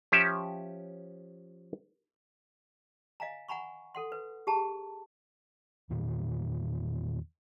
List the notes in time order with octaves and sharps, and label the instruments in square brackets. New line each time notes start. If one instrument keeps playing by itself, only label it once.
[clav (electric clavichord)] F3 C#4 G4 E5
[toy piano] D#5 F5 G#5 A#5
F#5 G#5 A#5 B5 C#6
A4 F#5 C6
B4
G4 G#4 A5 A#5
[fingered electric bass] E2 A#2 D#3